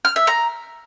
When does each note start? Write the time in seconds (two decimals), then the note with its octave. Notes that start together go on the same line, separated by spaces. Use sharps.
0.05 F6
0.16 E5
0.27 A#5